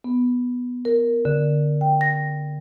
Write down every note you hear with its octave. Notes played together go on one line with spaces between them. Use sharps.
B3
A#4
D3
G5
A#6